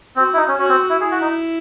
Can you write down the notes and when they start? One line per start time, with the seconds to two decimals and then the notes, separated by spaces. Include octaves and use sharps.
0.16 C4 F#4
0.34 E4
0.37 D#4
0.48 C#4
0.58 C#4 F#4
0.69 C4
0.90 E4
1.01 E4 G#4
1.11 F#4
1.21 D#4